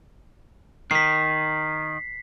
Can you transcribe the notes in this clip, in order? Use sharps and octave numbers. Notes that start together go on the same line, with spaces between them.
D#3 B6 C7